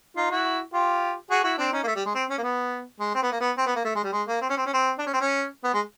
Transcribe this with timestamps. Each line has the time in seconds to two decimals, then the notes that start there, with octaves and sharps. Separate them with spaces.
0.17 D#4 F4
0.31 E4 F#4
0.73 F4 G4
1.30 F#4 G#4
1.44 E4 F#4
1.58 C4 D4
1.73 C#4 D#4
1.83 A#3
1.87 A3
1.96 G3
2.05 G#3
2.15 C4
2.30 C#4
2.38 A#3
2.43 B3
3.00 G#3
3.15 C4
3.23 B3
3.32 A#3
3.41 B3
3.57 C4
3.67 B3
3.76 A#3
3.84 A3
3.95 G#3
4.04 G3
4.13 G#3
4.28 A#3
4.42 C4
4.50 C#4
4.57 C4
4.66 C#4
4.73 C4
4.98 D4
5.06 C#4
5.13 C4
5.21 C#4
5.64 B3
5.74 G#3